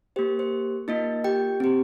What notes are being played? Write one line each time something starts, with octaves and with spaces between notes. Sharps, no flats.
A#3 G4 C5
C5
A#3 D#4 F4 D#5
G4 G5
C4 G4